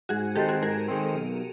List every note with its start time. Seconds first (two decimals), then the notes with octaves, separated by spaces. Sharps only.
0.09 G#2 F#4 G#4
0.35 D#3 G#3 C4 G4 A4
0.49 F#4 G#4
0.62 G#2 G#4 A#4
0.88 D#3 G#3 C4
1.15 B1